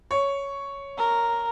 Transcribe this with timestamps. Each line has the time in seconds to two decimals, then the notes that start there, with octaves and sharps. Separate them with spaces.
0.11 C#5
0.98 A#4